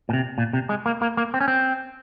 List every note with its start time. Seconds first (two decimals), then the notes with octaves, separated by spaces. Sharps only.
0.09 A#2
0.13 C3
0.38 A#2
0.53 C3
0.69 G#3
0.86 A#3
1.02 A#3
1.17 A#3
1.34 C4
1.41 C#4
1.48 C4